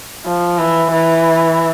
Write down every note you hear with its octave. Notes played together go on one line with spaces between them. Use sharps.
F3
E3
E3